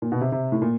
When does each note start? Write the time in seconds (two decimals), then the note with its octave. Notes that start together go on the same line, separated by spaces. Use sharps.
0.02 A#2
0.12 B2
0.21 C3
0.32 C3
0.52 A2
0.62 A#2